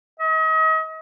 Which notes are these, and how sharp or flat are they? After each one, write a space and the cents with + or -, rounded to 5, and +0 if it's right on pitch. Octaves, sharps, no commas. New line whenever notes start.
D#5 +40